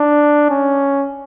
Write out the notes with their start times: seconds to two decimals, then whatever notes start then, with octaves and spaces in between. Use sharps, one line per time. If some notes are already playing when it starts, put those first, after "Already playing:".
Already playing: D4
0.50 C#4